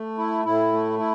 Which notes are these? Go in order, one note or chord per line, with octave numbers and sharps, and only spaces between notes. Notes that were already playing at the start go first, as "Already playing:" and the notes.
Already playing: A3
E4
A2 E4
A3
E4